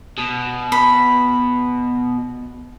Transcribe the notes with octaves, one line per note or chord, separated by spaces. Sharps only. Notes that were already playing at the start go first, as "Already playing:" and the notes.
B2
B5